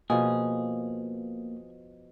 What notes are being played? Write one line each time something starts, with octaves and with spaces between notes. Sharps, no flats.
B2 F3 A#3 G#4